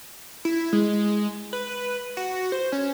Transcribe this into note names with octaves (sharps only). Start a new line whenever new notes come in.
E4
G#3
B4
F#4
C5
C#4